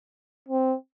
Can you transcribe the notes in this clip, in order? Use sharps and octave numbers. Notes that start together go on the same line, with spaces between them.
C4